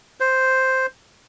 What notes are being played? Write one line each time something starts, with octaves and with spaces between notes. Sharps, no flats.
C5